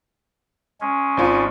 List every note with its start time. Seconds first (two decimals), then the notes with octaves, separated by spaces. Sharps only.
0.81 G#3 C#4
1.17 G#1 F4